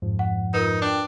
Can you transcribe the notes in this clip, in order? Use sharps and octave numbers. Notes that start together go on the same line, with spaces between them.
F2 G#2 F3
F#5
D#4 F4 A#4 B4
D4 G5